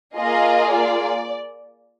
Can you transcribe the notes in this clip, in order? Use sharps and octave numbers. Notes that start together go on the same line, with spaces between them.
A#3 F4 G#4 D#5
D5